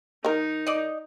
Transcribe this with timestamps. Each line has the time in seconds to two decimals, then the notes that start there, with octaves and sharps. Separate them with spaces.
0.25 D#3 D#4 A#4
0.67 D5 D#5